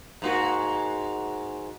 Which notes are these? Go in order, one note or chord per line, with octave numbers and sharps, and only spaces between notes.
G#2 A#3 F#4